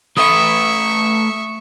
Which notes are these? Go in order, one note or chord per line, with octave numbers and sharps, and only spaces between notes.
A3 B4 E5 C#6 D#6